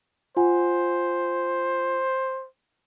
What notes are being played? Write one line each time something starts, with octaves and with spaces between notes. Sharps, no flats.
F4 C5 F#5 G#5